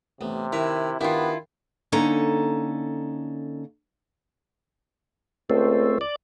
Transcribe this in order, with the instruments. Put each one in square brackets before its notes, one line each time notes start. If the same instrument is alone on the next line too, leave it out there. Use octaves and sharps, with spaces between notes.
[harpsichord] A1 B3 [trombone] C3
[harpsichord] D#3 B4 A#5 [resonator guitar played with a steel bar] E4
[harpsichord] D#3 D4 G4 [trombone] B3 [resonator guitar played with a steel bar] E4 F4
[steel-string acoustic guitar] D3 A#3 C#4 D#4 A4 A#5
[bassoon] C#2 [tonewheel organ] A3 C4
[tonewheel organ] D5